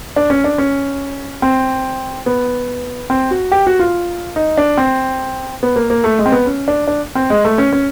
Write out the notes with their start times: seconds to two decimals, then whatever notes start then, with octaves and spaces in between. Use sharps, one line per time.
0.16 D4
0.30 C#4
0.44 D4
0.58 C#4
1.42 C4
2.26 B3
3.10 C4
3.31 F#4
3.52 G4
3.67 F#4
3.80 F4
4.36 D#4
4.57 D4
4.78 C4
5.63 B3
5.76 A#3
5.90 A#3
6.04 A3
6.19 G#3
6.26 C4
6.32 B3
6.46 C#4
6.68 D4
6.87 D4
7.15 C4
7.30 G#3
7.45 A3
7.58 C#4
7.73 C#4